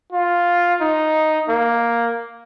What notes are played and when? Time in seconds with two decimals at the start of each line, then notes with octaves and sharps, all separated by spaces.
0.12 F4
0.81 D#4
1.49 A#3